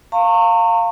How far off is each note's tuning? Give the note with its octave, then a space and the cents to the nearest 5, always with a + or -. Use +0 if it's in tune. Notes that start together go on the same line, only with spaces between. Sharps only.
F5 +5 A#5 -40 C#6 -25